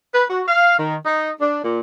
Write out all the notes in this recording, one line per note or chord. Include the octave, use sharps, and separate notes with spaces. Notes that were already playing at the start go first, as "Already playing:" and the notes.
B4
F#4
F5
D#3
D#4
D4
A#2